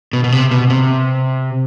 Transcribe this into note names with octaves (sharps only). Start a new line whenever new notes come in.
B2
B2
C3
B2
C3